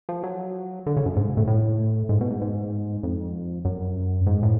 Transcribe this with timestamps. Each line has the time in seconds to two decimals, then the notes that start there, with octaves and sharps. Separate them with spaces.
0.09 F3
0.23 F#3
0.86 D3
0.97 C#3
1.06 F#2
1.17 G#2
1.37 A2
1.48 A2
2.09 G#2
2.21 B2
2.30 G#2
2.41 G#2
3.03 F2
3.65 F#2
4.26 G#2
4.43 A2